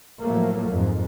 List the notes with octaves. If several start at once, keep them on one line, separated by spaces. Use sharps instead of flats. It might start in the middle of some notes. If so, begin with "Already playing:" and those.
A2 F3 F#3 A3 A#3
F2 G#2